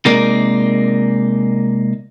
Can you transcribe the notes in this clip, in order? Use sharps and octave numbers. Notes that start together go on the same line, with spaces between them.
C3 G#3 A#3 D#4 A#4 D5